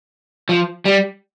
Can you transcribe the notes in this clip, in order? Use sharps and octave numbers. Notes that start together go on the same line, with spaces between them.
F3
G3